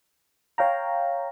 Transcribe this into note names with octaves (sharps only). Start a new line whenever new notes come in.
C#5 F5 G5 A#5